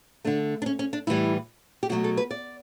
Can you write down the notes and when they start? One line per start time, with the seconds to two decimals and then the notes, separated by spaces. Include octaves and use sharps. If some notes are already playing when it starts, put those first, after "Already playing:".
0.24 D3 A3 D4
0.62 D4
0.66 C#4
0.79 C#4
0.93 D4
1.07 A2 E3 G3 E4
1.83 G4
1.89 B2 F#3 A3 F#4
2.04 A4
2.17 B4
2.31 D5